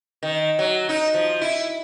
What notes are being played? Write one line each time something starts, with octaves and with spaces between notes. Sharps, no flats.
D#3
F#3
D#4
F3
E4